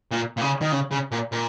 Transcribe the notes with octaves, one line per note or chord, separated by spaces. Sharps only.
A#2
A#2
C#3
D#3
C#3
C#3
A#2
A#2